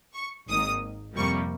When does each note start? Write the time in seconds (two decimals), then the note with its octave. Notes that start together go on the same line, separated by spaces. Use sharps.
0.14 C#6
0.48 G#1 G#2 D#3 A#3 D#6
1.15 F2 C3 G3 A#3 C#6